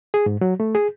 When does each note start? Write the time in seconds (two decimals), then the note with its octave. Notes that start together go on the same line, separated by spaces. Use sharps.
0.14 G#4
0.26 G#2
0.41 F#3
0.60 A3
0.75 G#4